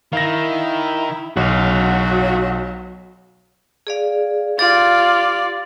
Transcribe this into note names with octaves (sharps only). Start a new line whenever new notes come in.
D#3 E4 F5 A#6
B1 F#3 F#4 F5
G#4 D5 F5
F4 G4 D5 A6